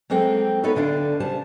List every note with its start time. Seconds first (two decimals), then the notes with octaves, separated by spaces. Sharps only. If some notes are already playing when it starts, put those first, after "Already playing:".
0.10 F#3 G#3 A#3 C4 A4 G5
0.63 B3 D#4 A4 B4 C#5
0.75 D2 D3 D4 F5
1.20 C#3 G3 C5 A5